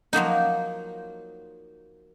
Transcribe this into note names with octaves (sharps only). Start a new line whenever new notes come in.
F3 F#3 A#3 D#4